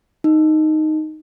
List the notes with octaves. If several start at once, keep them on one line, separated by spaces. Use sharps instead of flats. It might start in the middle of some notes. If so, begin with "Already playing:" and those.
D#4